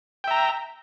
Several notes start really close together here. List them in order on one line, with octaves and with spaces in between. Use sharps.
G5 E5 A#5